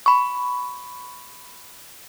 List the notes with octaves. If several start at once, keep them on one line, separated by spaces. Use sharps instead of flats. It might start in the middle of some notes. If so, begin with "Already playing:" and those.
B5 C#6